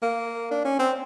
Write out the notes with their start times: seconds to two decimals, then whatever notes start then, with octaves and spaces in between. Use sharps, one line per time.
0.03 A#3
0.51 D4
0.65 C#4
0.79 C4